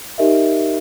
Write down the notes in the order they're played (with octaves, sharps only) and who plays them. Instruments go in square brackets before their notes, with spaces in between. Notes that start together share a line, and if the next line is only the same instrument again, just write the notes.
[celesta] D#4 G4 A#4 D#5 E5